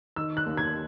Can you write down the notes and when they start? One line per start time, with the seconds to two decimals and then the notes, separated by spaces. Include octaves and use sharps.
0.16 D#3 E6
0.37 F#6
0.46 D#2
0.57 G#6